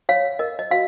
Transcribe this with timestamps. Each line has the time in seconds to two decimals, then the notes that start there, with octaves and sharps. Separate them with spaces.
0.09 C#5 F5
0.39 A#4 D#5
0.59 D#5
0.71 F#4 F5